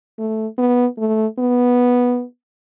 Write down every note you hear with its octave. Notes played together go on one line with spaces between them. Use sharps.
A3
B3
A3
B3